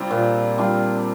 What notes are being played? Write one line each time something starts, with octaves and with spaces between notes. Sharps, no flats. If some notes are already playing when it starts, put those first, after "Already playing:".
Already playing: C3 G3 C4 D4 F4
A#2
G3 D4 F4